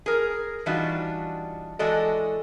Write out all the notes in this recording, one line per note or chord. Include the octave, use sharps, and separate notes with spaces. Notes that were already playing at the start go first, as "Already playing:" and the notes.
G#4 A#4
E3 G3 D4 D#4 F4 F#4
E3 G#3 F#4 A4 D5 D#5